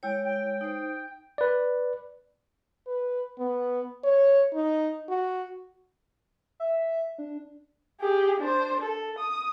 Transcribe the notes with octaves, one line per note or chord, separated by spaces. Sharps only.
G#3 E4 C#5 G5
G5
D#4 C5
B4 D5
B4
B3
C#5
D#4
F#4
E5
D4
G4 G#4
D4 C5
A4
D#6